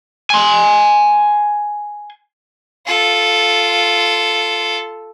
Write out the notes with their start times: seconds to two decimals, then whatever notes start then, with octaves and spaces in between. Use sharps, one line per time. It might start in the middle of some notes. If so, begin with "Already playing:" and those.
0.30 G#5 C6
2.86 F4 A4